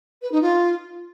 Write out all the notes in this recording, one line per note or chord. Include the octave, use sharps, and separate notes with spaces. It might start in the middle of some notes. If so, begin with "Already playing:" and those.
B4
D#4
F4